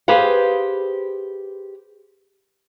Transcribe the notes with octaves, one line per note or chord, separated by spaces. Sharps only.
G4 G#4 B4 C5 F5